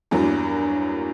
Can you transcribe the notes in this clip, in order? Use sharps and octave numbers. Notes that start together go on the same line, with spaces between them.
E2 G2 F#3 A#3